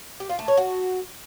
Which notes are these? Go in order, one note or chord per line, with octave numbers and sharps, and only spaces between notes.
G4
F4
A3
C#5
F#4